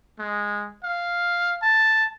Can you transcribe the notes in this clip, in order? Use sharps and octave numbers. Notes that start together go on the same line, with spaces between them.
G#3
F5
A5